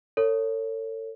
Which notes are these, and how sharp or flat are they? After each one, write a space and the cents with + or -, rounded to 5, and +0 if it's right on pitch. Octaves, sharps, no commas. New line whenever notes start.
A4 +40 C#5 +0